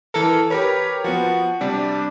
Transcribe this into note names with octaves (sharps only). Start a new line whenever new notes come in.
E3 A4 A#4
G4 A#4 B4 C#5
F3 B3 F#4
C3 G3 D4